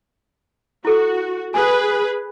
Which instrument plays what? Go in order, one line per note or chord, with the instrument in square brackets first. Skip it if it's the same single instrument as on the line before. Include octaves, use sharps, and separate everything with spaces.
[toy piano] E4 A4 [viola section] F#4
[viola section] G#4 B4 [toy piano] G#5